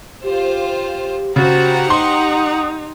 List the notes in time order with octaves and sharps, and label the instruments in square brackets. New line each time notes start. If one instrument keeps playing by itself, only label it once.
[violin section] F4 C5 [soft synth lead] G4
[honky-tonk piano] C#3 [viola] F#4 C5 [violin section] G4 F#5 A#5 [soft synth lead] A6
[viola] D#4 [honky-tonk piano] C6 [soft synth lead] D#6